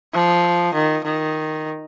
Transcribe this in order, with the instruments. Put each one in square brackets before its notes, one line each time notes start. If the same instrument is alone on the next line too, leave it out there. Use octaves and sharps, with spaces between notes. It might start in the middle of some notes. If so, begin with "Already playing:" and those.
[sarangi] F3
D#3
D#3